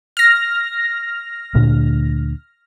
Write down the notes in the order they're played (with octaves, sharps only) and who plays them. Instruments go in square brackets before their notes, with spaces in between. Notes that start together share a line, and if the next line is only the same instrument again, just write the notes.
[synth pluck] F6 A#6
[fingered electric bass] D2 A#2 D4